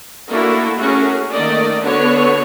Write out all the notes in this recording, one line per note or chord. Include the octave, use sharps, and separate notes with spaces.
A3 A#3 D4 E4 F#4 A4
A3 C#4 F#4 G#4 A#4
D#3 A3 A#3 D5 D#5
D3 B3 F#4 C#5